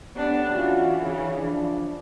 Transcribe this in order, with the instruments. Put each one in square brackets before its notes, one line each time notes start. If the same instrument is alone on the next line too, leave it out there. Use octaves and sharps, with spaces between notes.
[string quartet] B3 D4 [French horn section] C#4 G4 A4
[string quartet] E3 [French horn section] C#4 F4 F#4
[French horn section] C#3
F3 D4